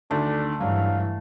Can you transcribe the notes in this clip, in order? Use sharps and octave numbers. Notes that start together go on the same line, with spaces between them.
D2 D3 D#3 A3 D4
G2 E3 F#3 D4 F5